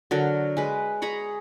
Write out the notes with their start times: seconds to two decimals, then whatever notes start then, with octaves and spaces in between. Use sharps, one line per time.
0.11 D3 F#3 A#4
0.57 G#3 B4
1.02 G#4 A#5 B5 C#6